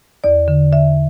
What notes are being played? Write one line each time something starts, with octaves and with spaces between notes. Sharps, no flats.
E2 D5
D3
D3 E5